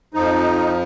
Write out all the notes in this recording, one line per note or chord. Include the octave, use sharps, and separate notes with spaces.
F2 F3 D#4